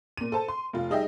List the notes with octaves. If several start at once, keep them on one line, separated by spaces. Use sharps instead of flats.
A#2 D#7
A4 C5 A5
C6
F1 F4
G3 D#4 G#4 D#5 E5 G5